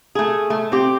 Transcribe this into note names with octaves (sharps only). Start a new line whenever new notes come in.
A3 G#4
A3
C4 G4